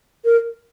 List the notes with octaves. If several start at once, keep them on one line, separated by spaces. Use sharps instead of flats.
A#4